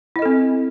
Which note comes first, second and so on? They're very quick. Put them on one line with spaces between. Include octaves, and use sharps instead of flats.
E4 D#5 A4 C4